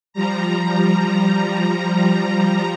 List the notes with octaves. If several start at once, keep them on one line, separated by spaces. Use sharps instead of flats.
F3 G3 A#5